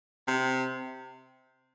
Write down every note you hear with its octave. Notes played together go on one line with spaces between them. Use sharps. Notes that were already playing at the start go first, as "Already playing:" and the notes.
C3